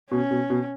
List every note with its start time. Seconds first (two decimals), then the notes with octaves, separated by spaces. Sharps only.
0.11 B2 C#4
0.31 B2
0.50 B2